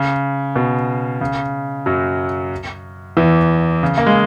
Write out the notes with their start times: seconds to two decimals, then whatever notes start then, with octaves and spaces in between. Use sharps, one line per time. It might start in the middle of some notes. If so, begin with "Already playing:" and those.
Already playing: C#3
0.56 B2
1.21 C#3
1.86 F#2 F#3
3.17 E2 E3
3.83 C#3
3.97 A#3
4.06 G#3